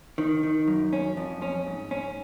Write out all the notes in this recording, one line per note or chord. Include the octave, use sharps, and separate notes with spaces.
D#3
D#3
F#2
C#4
F2
C#4
G#2
C#4